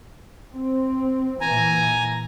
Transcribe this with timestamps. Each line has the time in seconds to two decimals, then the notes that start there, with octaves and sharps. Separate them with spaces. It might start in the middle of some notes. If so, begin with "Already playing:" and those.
0.52 C4
1.41 A#2 E3 G#5 A#5